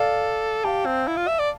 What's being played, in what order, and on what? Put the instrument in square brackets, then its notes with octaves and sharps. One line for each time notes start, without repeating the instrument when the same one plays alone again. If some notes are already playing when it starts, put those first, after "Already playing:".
Already playing: [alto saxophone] A4 [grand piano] D5 F5
[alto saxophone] G4 [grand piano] F5 A5
[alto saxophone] C4
E4
F4
E5
D5